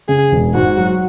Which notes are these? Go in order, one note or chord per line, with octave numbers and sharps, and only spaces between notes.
C#3 G#4
E1
G#2 F#4
F#3